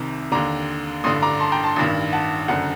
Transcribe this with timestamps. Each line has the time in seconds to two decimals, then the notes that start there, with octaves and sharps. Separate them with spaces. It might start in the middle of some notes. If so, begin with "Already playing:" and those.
Already playing: C2 C3 D#3
0.32 D#2 D3 A#5 D6
1.04 A1 G2 D3 C6 D#6
1.22 A#5 D6
1.40 A5 C6
1.52 G5 A#5
1.64 A5 C6
1.76 A1 G2 D#3
2.13 F#5 A5
2.48 F#1 F#2 D3 F#5